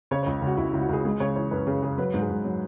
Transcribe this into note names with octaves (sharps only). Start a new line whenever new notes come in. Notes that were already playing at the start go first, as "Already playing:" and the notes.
C#3 C#5
C#5
C#2
C#2 F#4
C#2 E4
E4
C#2
F#4
C#2 G#4
G#3 G#4
C#3 C#5
E3 C#5
F#2 B4
C#3 G#4
C#3 G#4
F#3 B4
G#2
G#4
G#2
F#3